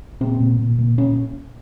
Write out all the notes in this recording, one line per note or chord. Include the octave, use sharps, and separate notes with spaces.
A#2 C4
A#2
A#2
A#2
A#2 C#4